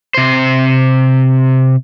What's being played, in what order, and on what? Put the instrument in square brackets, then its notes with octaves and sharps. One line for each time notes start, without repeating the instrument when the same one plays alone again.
[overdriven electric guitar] C3 C5